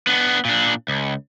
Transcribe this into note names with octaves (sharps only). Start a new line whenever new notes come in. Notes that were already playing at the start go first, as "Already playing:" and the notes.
B3 D4
A#2 D4
C#2